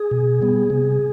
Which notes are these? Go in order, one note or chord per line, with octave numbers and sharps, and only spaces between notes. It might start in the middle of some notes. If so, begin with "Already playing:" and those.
Already playing: G#4
B2
G3 B3
C3